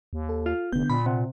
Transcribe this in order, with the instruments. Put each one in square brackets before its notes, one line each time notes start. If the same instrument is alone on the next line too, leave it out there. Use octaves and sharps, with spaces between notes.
[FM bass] D#2
[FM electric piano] A4
[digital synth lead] F4
[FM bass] F1 [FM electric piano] D3 B3 [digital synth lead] G6
[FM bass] A#2 [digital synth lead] B5
[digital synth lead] C3 [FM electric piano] F#5